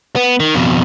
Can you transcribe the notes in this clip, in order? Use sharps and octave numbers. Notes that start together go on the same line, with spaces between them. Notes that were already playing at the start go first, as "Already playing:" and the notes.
B3
D#3
F2 B2